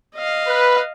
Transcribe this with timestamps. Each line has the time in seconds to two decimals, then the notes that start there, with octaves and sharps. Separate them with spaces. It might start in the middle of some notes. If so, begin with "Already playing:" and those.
0.15 D#5 F5
0.48 B4